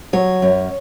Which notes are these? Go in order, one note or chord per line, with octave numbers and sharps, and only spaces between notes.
F#3 C#5
F#2